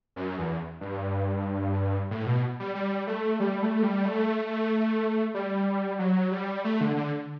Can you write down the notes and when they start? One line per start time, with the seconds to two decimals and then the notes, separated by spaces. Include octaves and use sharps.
0.16 F#2
0.38 E2
0.81 G2
2.11 A2
2.26 B2
2.60 G3
2.75 G3
3.07 A3
3.40 G3
3.62 A3
3.83 G3
4.05 A3
5.34 G3
5.99 F#3
6.31 G3
6.64 A3
6.81 D3
6.96 D3